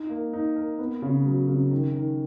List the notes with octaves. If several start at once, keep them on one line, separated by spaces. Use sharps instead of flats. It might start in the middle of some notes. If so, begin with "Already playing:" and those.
Already playing: D#4
A#3
D#4
A#4
B3
C#3
F#3
C#3
D#3
D#3